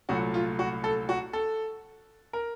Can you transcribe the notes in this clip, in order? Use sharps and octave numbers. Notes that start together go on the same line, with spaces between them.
C2 A#2 F#3 A3 F#4
F4
F#4
A4
F#4
A4
A#4